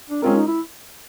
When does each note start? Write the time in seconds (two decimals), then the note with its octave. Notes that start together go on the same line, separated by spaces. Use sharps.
0.10 D4
0.22 G#3 C4 C#4 F4 A#4
0.35 D#4
0.47 E4